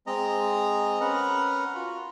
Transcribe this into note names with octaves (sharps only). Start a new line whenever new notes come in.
G#3 C4 D#5 A#5
C#4 A#4 B4 F#5 A#5
F4 F#4